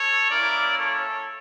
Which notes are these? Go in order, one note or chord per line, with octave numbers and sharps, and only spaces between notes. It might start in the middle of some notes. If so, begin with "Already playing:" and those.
Already playing: A4 C#5
A#3 C#4 E4 A#4 D5
A4 C#5